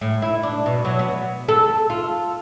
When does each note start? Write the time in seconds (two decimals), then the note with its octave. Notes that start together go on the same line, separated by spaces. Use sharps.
0.01 A2
0.22 E4
0.43 D4
0.66 B2
0.85 F#3
0.99 B3
1.49 A4
1.90 F4